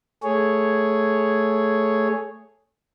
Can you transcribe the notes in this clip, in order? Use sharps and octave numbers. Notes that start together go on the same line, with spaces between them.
A3 G#4 C#5